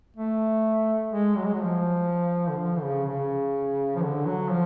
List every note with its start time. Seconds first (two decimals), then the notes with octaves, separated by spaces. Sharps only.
0.17 A3
1.13 G#3
1.37 F#3
1.46 G#3
1.54 F#3
1.61 F3
2.49 D3
2.57 F3
2.82 C#3
3.06 C#3
3.96 F3
4.02 D3
4.26 F#3
4.50 F3